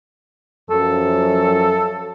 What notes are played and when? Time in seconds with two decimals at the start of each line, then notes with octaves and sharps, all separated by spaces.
0.70 F#2 F3 A4